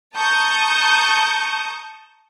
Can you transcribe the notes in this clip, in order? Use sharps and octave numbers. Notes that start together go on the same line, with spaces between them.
A5 A#5 C#6 D#6 G6